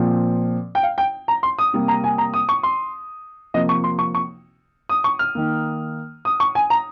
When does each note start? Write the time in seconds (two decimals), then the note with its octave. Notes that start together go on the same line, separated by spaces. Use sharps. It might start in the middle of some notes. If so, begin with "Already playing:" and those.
Already playing: A#2 F3 C4
0.75 G5
0.83 F5
0.98 G5
1.28 A#5
1.43 C6
1.59 D#6
1.73 C3 G3 A#3
1.88 A#5
2.04 G#5
2.18 A#5
2.34 D#6
2.49 C#6
2.63 C6
3.54 C3 F3 A#3 D#5
3.69 C#6
3.84 C6
3.99 C#6
4.15 C#6
4.89 D#6
5.04 C#6
5.19 F6
5.35 D#3 A#3
6.25 D#6
6.40 C#6
6.55 G#5
6.70 A#5